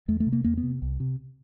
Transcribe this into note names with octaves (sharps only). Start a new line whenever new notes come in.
E2 A3
A3
C3
A#3
E2 A#3
B3
C3
C2
C3